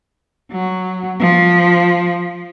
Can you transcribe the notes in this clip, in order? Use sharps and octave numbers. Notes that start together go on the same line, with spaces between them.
F#3
F3